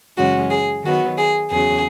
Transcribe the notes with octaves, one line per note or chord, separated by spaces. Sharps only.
F#2 C#3 E3 G#3 C#4 F#4
G#4
D#3 F#3 B3 F#4
G#4
E2 C#3 F#3 G#4